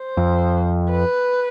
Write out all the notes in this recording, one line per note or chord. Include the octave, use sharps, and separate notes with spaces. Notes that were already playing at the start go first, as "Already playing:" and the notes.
Already playing: C5
F2
B4